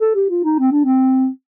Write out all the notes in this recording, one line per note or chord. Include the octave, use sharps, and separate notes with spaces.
A4
G4
F4
D#4
C4
D4
C4